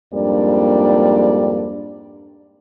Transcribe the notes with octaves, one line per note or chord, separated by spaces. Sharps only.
F2 G#2 G3 A#3 D4 D5